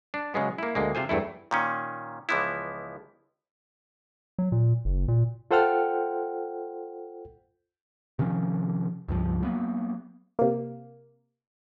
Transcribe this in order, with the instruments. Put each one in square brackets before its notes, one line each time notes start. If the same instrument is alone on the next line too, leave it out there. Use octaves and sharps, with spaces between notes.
[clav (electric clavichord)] D4
C#3 F#3 G#3 B3
A#3 E4
D2 G#3 A#3
C3 F4 C5 G#5
E2 G2 A3 E4
A#2 D#3 C#4
C#2 E3 F3 B3 E4
[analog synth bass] F#3
A#2
F#1
A#2
[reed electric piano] F4 A4 C5 F#5 G5 F6
[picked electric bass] C3 D#3 F3 C#4
C#2 G2 F3
F#3 A#3 B3
[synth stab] C3 A#3